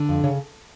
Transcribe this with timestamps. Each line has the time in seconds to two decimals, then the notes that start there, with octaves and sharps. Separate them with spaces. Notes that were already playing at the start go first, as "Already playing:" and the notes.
Already playing: D3
0.09 F2
0.24 C#3 C#5